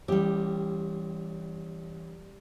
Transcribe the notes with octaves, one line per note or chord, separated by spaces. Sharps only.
A1 G3 G4